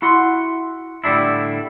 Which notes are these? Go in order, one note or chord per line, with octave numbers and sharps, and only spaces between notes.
E4 F#4 F#5 C6
A2 D3 G3 D4 E4